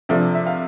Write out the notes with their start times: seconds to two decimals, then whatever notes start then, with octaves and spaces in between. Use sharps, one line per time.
0.09 C3 F3 A3 D4
0.35 E5
0.47 F5